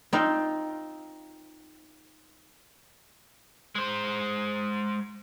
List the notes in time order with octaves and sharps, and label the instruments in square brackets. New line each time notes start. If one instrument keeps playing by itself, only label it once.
[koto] C4 D#4 F4
[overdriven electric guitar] G#3 C5